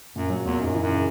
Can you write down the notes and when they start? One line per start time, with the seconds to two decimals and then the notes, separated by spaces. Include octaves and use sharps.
0.15 F#2 A#2
0.30 F#3
0.44 E2 A#2
0.60 F#2 D#4
0.74 E3
0.82 F#2
0.89 C#3